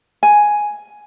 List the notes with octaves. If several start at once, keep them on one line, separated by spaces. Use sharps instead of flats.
G#5